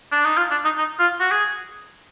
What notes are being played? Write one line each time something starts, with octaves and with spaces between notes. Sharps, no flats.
D4
D#4
F4
D4
D#4
D#4
F4
F#4
G#4